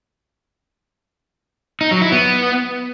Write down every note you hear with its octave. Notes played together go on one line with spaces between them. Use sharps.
D#4
F#3
E4
B3